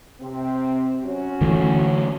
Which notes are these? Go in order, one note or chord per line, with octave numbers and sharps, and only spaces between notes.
C3 C4
F#3 C#4 F#4
D3 E3 A3